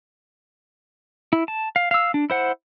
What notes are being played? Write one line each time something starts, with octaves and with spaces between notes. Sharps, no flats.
E4
A5
F5
F5 E6
D4
E4 C5 F#5